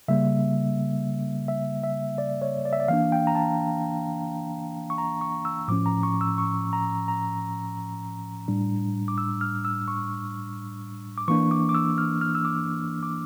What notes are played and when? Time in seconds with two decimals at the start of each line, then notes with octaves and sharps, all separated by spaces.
0.08 C#3 G3 A#3 E5
1.48 E5
1.84 E5
2.18 D5
2.42 C#5
2.65 D5
2.73 E5
2.80 D5
2.88 E3 A#3 D4 F5
3.12 G5
3.27 A#5
3.35 A5
4.90 C#6
4.98 A#5
5.21 C#6
5.45 E6
5.68 A2 F3 C#4 D6
5.86 A#5
6.03 C#6
6.21 E6
6.38 C#6
6.73 A#5
7.08 A#5
8.48 A2 G3 D4
9.08 D6
9.18 E6
9.41 F6
9.65 E6
9.88 C#6
11.18 D6
11.28 E3 A#3 D4 C#6
11.51 D6
11.69 D6
11.74 E6
11.98 F6
12.21 F6
12.35 E6
12.45 D6
13.03 D6